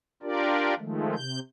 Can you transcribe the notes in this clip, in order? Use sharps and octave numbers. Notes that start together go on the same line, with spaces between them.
D4 F4 G4 A#4 D5
D#3 F3 G#3 A3
C3 G6